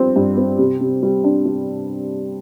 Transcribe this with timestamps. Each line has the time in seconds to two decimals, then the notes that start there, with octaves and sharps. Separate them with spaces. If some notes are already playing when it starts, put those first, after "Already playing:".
Already playing: G2 F3 C4 G4
0.16 G2
0.37 C4
0.58 C3
0.81 C3
1.03 G3
1.24 D4
1.45 G3